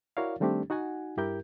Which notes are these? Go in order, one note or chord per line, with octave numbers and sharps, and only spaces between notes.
E4 F#4 A#4 C#5 D5 F5
D#3 G3 A3 C4 D4 G4
D#4 F#4 F#5 G#5
G2 E4 G4 A#4 G6